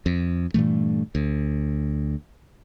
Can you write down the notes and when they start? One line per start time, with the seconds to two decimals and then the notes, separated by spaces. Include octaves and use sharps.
0.06 F2
0.54 G2 A#2 E3 A3
1.15 D2